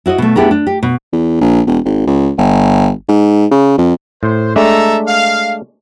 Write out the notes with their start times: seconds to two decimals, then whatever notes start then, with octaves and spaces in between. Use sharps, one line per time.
0.06 E4 F#4 C5 D#5
0.18 B2 A3
0.36 B3 D4 E4 G4 G#4 A#4
0.51 D4
0.67 G4
0.83 B2
1.12 E2
1.41 A#1
1.67 E1
1.85 G#1
2.07 C#2
2.38 G1
3.08 G#2
3.51 C#3
3.78 F2
4.23 A2 C5
4.56 G#3 A3 D4 A4 E5 A#5
5.08 F5